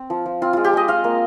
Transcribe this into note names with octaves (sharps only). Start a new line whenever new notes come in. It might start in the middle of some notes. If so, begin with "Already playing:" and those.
Already playing: C4
F3
F3
C4 F4
G#3 F4
G4
G#3 D#5
F4 F5
A#3